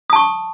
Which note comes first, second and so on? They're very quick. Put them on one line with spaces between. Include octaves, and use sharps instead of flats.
D#6 A5 C#6